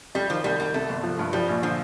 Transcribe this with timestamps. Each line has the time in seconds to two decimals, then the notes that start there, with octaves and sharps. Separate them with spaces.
0.15 F2 G3
0.30 D#3 F3
0.44 C2 G3
0.60 C2 G3
0.74 C3 A3
0.89 G1
1.03 F3
1.19 G2
1.33 F3 G3
1.49 A#1
1.63 D3 F3